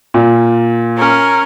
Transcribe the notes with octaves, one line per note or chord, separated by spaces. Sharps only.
A#2
C#4 A#4